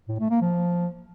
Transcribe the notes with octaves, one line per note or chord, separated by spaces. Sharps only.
A2
A3
A#3
F3